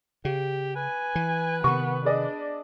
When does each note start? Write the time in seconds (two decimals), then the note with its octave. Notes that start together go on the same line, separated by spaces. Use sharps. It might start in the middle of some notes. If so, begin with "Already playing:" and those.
0.25 C#3 G4
0.76 B4 G#5
1.15 E3
1.64 C3 D#3 B3 C#6
2.05 D4 G#4 D5 D#5